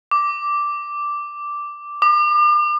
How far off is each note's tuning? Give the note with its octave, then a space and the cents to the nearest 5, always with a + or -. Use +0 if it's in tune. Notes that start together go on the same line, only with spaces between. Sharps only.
D6 -5
D6 +40